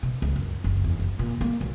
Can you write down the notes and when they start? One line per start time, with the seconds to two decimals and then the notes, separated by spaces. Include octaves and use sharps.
0.03 B2
0.22 C#2
0.36 F#2
0.64 F#1
0.84 E2
0.99 F#1
1.19 A#2
1.41 A#3
1.61 B1